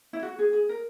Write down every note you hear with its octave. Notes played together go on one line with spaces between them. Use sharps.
E4
F#4
G#4
G#4
A#4